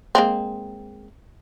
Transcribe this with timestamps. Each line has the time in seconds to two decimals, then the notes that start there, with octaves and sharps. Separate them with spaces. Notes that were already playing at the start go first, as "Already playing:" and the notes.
0.15 G#3 A#3 C4